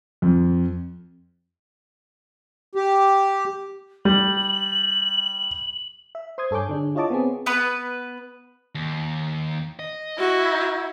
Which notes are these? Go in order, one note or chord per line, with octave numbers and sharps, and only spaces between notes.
F2
G4
G3 F#7
E5
C5 C6 D#6 G#6
G2 A4 C#5 G#5 D6 G6
D3 D4 G#4
E4 F4 C#5 D#5 A5 D6
B3 C4 G#4
B3 B4
D#2
D#5
E4 F#4